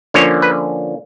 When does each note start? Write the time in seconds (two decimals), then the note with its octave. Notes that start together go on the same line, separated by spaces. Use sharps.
0.14 D3 F3 A#3 C#4 C#5
0.42 B4